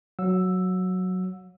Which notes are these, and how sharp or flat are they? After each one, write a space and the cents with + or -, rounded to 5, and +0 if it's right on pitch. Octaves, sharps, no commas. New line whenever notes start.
F#3 +0 F#5 -40 E6 +0